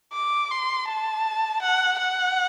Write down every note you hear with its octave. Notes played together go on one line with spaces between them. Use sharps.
D6
C6
A5
F#5
F#5